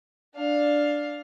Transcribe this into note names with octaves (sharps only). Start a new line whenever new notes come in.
D4 F5